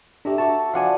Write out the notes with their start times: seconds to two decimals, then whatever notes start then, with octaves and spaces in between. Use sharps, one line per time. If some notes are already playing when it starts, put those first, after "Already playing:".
0.25 A3 D4 G4 E5 A#5
0.38 F#4 A5 C#6 D6
0.74 F3 D4 D5 F5 F#5 G#5